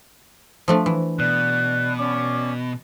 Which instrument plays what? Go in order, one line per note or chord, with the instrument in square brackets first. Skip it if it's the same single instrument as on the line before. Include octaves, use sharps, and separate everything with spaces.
[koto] F3 A3 D4
E3
[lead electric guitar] B2 [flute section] D5 F#6
[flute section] C#4 D5 D6